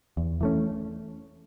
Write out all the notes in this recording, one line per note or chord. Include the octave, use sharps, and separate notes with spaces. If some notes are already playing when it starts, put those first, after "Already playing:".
E2
E3 A3 C#4